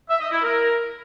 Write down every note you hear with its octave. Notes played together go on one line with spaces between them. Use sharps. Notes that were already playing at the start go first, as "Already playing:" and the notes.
E5
D#5
E4
A#4